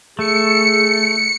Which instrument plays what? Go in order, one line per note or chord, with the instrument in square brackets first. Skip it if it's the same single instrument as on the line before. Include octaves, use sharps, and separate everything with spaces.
[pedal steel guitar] A3 [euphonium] G#4 [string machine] C#7